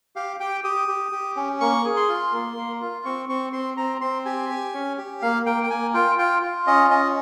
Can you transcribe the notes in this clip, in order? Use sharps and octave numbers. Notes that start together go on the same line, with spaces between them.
G4 F5
G4 G5
G4 D#6
G4
G4
C#4
A#3 C#6
G#4
C6
F4
A#3
A#3
F4
C4 C#6
C4 C#6
C4 C6
C4 A#5
C4 C6
G4 G#5
G4
C#4
G4
A#3 F5
A#3 G5
G5
A#3 G#5
F4 G5
F4 G5
F4
C#4 D#5
C#4 D#5